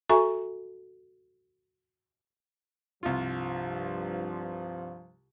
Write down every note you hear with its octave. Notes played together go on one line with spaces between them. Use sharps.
F#4 A4 E5 G#5 A#5 C#6
C2 G2 F3 F4